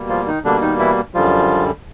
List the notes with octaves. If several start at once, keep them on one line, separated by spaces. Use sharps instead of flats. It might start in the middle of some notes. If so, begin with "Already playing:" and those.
Already playing: B2 G3 A#3
F3 F4
D#3 D#4
B2 D3 G3 A#3 D4
D#3 D#4
E3 E4
F#2 D3 F3 G3 F4